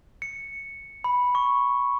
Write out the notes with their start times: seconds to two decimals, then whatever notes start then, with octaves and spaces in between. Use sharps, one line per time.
0.22 C#7
1.04 B5
1.35 C#6